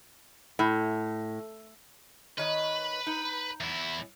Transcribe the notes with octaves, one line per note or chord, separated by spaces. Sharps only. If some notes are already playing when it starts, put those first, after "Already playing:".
A2
D#3 B4 C#5 D#5
D#4
E2 E4